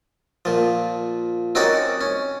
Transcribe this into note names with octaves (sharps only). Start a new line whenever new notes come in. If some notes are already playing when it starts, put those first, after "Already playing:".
A#2 F3
C4 C#4 D#4 F#4 A#4 D5
C#4